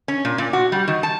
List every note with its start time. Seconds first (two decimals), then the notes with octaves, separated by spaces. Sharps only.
0.08 C#4
0.25 A#2
0.38 A#2
0.53 F#4
0.72 G3
0.88 D#3
1.03 A5